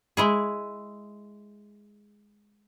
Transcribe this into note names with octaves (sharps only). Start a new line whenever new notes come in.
G#3 E4 G#4